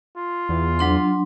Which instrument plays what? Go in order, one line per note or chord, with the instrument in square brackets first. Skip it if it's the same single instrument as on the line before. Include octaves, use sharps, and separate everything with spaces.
[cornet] F4
[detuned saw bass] E2
[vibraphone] F#3 D4 C6